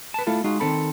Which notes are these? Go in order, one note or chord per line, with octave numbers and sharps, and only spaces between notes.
B4 A5
A3 E4 F4 A4
G#3 D#4 F4 F#4
D#3 C4 A4 B5